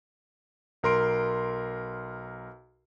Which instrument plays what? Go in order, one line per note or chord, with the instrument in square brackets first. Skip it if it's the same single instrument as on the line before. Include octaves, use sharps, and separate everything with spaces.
[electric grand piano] B1 A#4 C6 D7